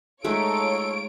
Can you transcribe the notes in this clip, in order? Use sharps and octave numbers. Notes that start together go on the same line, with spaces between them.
G#3 A3 D#4 F4 A4 C#5 D7